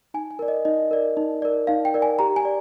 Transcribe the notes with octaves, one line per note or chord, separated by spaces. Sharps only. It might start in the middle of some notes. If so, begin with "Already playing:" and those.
D#4 G#5
G#5
A#4 D5
D#5
D#4 D#5
A#4 D5
D#4
A#4 D5
D#4 F5
G5
A#4 D5
G#5
G4 A#5
G#5
D5